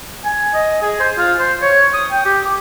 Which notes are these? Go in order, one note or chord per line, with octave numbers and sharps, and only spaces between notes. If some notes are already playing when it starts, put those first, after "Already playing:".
G#5
D#5
G#4
C5
F4
C5
C#5
D#6
G5
G4
D6